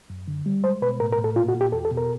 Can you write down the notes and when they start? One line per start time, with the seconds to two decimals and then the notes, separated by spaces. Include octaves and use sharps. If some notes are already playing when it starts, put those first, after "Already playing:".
0.10 F#2
0.28 D3
0.46 G3
0.64 G#3 C5
0.82 B2 B4
1.00 A2 A#4
1.12 A#4
1.18 A2
1.24 A4
1.36 A#2 F4
1.48 F#4
1.55 A#2
1.61 G4
1.72 E2 A4
1.85 A4
1.91 B2
1.97 A#4